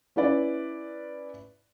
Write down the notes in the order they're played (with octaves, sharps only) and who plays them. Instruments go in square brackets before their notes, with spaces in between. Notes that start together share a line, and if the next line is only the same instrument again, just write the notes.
[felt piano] C#4 E4 B4 D5